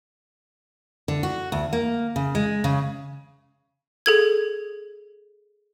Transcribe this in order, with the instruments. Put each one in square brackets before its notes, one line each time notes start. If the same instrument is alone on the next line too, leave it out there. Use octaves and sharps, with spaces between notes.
[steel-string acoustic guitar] D3
F#4
D2
A#3
C#3
G#3
C#3
[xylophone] G#4 A4 G#6